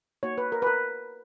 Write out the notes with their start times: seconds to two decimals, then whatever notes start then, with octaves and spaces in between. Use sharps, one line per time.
0.23 A#3 D#4 F#4 C#5
0.38 B4
0.52 A#4
0.62 B4
0.67 A#4